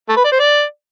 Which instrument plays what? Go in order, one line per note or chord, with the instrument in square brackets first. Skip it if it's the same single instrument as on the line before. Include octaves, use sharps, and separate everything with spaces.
[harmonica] A3
B4
D5
C5
D5